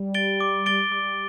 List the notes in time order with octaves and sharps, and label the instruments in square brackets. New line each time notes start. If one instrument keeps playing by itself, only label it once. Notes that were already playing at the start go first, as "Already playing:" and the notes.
Already playing: [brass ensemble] G3
[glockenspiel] A6 D7 G7
D6
A6 D7 G7
[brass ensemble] G3 [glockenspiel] D6